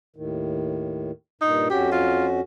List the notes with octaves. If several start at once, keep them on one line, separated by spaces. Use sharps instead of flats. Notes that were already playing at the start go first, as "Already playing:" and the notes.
D#2 A2 D#3
G2 A#2 D#4
F2 C#4 F#4 G4
F4